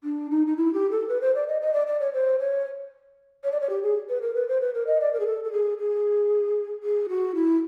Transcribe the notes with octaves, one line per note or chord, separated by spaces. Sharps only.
D4
D#4
D#4
E4
G4
A4
B4
C5
D5
D#5
D#5
D5
D5
C#5
C5
C#5
C#5
D5
C#5
G4
G#4
B4
A#4
B4
C5
B4
A#4
D#5
D5
A#4
G#4
A4
A4
G#4
G#4
G#4
F#4
E4